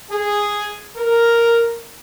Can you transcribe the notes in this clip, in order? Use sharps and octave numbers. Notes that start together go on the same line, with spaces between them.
G#4
A#4